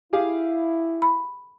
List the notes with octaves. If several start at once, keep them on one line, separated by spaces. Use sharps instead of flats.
E4 G4 G#4 F5
B5